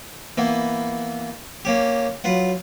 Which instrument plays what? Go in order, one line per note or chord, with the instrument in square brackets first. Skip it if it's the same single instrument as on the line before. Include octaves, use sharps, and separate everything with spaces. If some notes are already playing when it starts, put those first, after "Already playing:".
[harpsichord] E3 A#3 B3
A#3 C#4 G4
[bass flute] F#3 [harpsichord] F4 B4 F#5